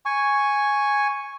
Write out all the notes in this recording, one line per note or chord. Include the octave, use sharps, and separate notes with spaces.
G#5 C#6